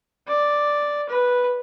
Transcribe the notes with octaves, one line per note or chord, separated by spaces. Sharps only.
D5
B4